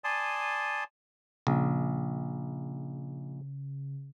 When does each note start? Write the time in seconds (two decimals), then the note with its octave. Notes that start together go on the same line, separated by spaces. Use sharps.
0.04 D5 G#5 A5 C6 D#6
1.47 A#1 C#3